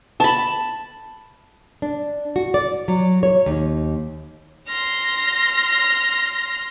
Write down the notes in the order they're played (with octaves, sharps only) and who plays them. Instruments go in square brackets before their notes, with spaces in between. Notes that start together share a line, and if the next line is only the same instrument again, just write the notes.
[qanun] A5 B5
[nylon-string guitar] D4
F#4
D5
F#3
C#5
D#2
[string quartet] C6 F6 A#6